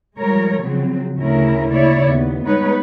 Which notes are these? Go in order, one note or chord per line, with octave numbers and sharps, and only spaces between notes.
F3 G3 G#3 A#4 C#5
C#3 F3 F#3 C4
D2 A2 C#3 C#4 E4 A#4
C#3 A#3 E4 C#5 D5
D#2 B3
G3 G#3 B3 D#4 B4 C#5